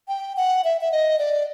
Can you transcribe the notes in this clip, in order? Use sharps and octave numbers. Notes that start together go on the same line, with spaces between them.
G5
F#5
E5
E5
D#5
D5